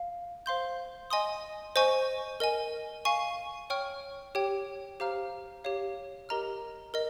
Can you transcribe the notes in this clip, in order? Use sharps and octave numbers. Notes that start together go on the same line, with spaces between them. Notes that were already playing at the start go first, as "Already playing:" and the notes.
Already playing: F5
C5 F5 C6 G6
D#5 G#5 C6 D#6
C5 D#5 G#5 C#6
A#4 D#5 G#5
F5 G#5 C#6
C#5 G5 C#6 F6
G4 C#5 G5
G4 C5 F5 A#5 F6
G4 C#5 F5
G4 A#4 D#5 A#5 F6
A#4 D#5